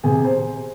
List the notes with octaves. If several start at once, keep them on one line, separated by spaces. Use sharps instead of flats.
C3 G#4 G#5
C5